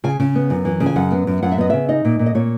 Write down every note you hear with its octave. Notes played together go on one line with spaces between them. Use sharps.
C#3 G#5
C#3
B3
F#2
E3
C#3
G#5
F#2 F#5
B3
F#2
F#2 F#5
E5
B3 D#5
C#3 E5
D#4 D#5
A#2
A#2
D#5
A#2 C#5